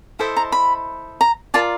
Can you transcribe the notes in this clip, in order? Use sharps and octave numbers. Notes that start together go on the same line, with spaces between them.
E4 A4 C5 D#5 E5
A#5
B5
A#5
F4 A#4 D5 A5